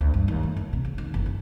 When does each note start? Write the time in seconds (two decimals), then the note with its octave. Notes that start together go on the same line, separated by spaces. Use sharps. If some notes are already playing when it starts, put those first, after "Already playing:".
0.01 D2
0.14 G2
0.28 D#2
0.43 A3
0.57 F#1
0.73 C3
0.85 C#3
0.98 D#2
1.14 F#1
1.26 C#4